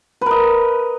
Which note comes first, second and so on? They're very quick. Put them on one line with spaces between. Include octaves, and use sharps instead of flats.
B4 A#4 D#5